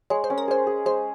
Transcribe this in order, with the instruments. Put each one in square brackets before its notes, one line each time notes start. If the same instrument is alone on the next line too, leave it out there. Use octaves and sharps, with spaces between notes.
[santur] G#3 [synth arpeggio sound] C#5
[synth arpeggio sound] C5
[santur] C#4
[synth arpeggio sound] A#4
[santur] G#4 [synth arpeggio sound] C5
[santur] G#4
[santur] G#3 [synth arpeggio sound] C5